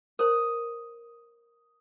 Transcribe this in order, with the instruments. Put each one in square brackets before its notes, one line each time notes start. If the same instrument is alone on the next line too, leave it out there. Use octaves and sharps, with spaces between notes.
[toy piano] A#4 C5 [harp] D#6